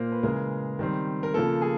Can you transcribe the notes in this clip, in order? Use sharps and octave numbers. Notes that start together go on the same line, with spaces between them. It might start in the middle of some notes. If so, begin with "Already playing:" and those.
Already playing: A#2 A#3 C5
B4
C#3 E3 G#3 A#4
D#3 G3 C4
A#4
C#3 F3 A#3 A4
G#4